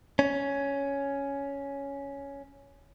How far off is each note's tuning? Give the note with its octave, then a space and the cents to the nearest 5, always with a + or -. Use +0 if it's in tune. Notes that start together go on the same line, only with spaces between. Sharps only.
C#4 +10